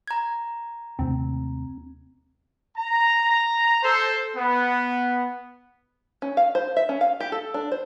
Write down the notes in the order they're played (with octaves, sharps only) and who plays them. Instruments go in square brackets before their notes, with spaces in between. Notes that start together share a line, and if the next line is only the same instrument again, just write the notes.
[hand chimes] A#5 G#6
[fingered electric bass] D#2 C3 A3 [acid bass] C4
[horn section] A#5
A4 C5
B3
[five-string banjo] C#4
F5
C5
E5
C#4
F5
G4
A4
D4
C5